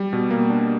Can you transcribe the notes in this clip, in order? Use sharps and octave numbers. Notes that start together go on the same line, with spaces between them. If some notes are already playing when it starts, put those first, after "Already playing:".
Already playing: G3
B2
A#3
D4